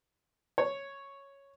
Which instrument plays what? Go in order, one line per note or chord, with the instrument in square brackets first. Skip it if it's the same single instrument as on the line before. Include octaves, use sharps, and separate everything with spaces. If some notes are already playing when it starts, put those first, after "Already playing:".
[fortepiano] C#5